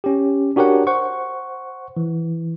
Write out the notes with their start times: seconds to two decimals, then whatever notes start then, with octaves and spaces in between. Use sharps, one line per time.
0.04 C#4 G4
0.56 D4 F#4 G4 A#4 C#5 F#5
0.87 C5 F#5 C#6
1.97 E3